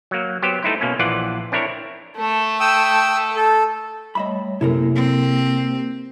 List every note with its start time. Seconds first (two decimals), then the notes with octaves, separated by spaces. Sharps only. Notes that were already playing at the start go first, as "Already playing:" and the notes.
0.11 F#3 A#3
0.42 F#3 B3 G4 C5
0.63 A3 D#4 E4 C5
0.81 B2 A#3 C#4
0.99 A#1 E3 F4 D5 F#5
1.52 C4 D4 E4 A#4 C#5
2.17 A3 A4
2.60 G5 D#6 E6
3.36 A4
4.15 G3 A3 C#5 D#5 E5 B5
4.61 F#2 C3 A#3 E4 A4 A#4
4.96 C4